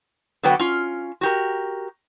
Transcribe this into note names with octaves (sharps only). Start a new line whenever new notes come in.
D3 F#3 B3 F#4 B4 G5
C#4 F4
F#4 G4 A#4